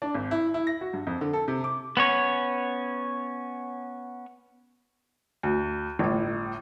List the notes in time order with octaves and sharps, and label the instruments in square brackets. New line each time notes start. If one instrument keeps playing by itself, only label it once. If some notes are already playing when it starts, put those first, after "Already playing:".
[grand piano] D4
G#1
E4
E4
A#6
F#4
G2
F2
D3
A4
C3
D6
[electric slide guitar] B3 C#4 C#5
[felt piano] D2
G1 A2